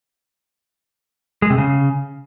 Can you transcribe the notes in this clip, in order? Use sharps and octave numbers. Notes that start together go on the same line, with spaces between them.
G#3
C3
C#3